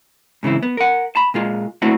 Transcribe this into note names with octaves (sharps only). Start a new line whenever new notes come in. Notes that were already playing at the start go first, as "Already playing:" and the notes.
G#2 C#3 E3 C4 E4
B3
A#4 F#5
A5 B5
A#2 G#3 F4
A3 A#3 C4 D4 E4 F#4